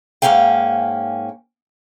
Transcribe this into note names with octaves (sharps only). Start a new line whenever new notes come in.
G#2 G#3 A#3 C#4 F5 G5